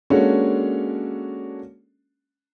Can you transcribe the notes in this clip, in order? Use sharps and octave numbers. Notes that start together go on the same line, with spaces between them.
G#3 A#3 C#4 D4 F#4 A4